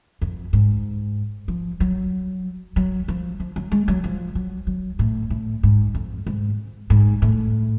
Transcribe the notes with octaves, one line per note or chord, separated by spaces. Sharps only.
F2
G#2
F3
F#3
F#3
F3
F3
F#3
G#3
F#3
F3
F#3
F#3
A2
A2
G#2
F2
G#2
G#2
A2